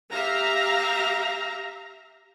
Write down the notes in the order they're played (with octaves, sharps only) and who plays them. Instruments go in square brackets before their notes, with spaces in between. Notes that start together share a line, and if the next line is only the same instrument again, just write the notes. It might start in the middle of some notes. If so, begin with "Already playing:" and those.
[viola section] G4 E5 F5 A#5